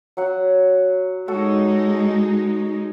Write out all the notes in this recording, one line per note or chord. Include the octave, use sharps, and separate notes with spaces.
F#3 F#5
G#3 D#4 F#4 A4